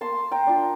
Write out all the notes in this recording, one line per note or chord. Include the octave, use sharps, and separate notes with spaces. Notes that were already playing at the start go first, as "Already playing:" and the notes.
A#3 A5 C6
G5 A#5
D4 F4